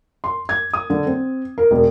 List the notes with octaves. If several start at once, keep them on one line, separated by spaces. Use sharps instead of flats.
C6
G#6
D#6
D3
C4
A#4
E1